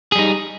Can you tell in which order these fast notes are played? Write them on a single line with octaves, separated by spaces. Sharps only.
G#4 G3 D#4